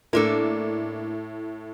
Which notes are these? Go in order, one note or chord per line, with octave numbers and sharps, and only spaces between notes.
A2 A#3 D4 A4